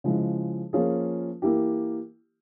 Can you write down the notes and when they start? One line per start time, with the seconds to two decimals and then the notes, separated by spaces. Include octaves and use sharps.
0.04 C#3 F3 G#3 E4
0.73 F3 A#3 C#4 F4 G#4
1.42 E3 A#3 E4 G4